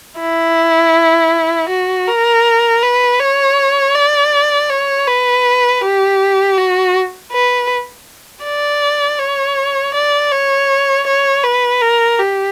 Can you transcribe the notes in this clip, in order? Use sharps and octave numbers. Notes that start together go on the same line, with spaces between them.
E4
F#4
A#4
B4
C#5
D5
C#5
B4
G4
F#4
B4
D5
C#5
D5
C#5
C#5
B4
A#4
G4